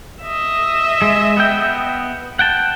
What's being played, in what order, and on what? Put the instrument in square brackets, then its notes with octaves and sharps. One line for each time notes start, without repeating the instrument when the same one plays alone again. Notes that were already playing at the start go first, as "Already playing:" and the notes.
[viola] D#5 E5
[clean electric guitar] G#3
B3 G5
F#5 G5 A5